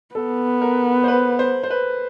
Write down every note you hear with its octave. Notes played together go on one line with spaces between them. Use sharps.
B3 A4
A#4
C5
B4
C5
C5
B4